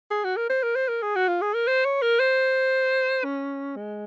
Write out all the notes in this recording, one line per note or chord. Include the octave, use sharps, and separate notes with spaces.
G#4
F#4
A#4
C5
A#4
C5
A#4
G#4
F#4
F4
G#4
A#4
C5
C#5
A#4
C5
C#4
G#3